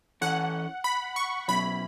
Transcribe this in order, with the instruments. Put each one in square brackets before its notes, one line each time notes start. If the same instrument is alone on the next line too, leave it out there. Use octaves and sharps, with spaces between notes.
[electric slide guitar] E3 C#4 A4 [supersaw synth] F#5
[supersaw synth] B5
C#6
[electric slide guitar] B2 F#3 C#4 E4 [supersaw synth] B5